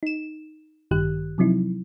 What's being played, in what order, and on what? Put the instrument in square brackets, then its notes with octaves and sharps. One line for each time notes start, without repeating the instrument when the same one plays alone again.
[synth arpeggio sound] D#4 E7
A1 G2 D#3 G4 F#6
C3 F3 F#3 C4 D#4 E4